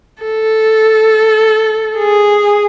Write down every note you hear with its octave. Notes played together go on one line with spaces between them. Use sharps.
A4
G#4